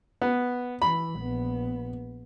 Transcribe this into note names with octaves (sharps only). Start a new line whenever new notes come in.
B3
E3 B5
A#1 B3